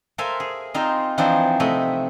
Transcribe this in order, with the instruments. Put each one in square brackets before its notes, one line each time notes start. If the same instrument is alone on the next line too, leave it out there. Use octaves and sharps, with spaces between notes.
[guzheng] A4 A#4 C5 E5 F5 G#5
G#4
C4 D#4 F4 A#4 C5 F5
E3 F3 C4 D4 D#4 C5
C3 A3 D#5 B5